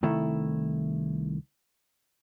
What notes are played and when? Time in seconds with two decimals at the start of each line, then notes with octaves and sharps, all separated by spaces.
0.03 C2 D#3 A3 E4